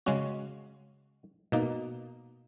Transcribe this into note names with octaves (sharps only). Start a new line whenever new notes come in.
C#3 G#3 C#4 F#4
B2 A#3 D#4